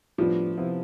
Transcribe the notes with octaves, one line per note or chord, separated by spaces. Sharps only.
A2 F3 G3 B3 D4
C3 F3 B3 E4